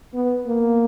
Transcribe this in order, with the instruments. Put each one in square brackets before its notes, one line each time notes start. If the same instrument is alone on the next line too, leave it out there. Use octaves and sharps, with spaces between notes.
[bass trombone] B3
A#3